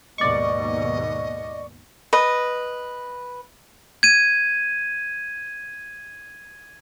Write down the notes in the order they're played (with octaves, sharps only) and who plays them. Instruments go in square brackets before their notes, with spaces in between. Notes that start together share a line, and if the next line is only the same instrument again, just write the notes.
[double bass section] D#2 G#2 B2 [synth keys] D5 C#6 [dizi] D#5
[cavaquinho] B4 D#5
[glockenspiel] G#6 D#7